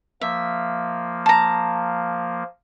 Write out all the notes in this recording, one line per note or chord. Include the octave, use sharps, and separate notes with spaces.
F3 A#3 E5
A5 A#5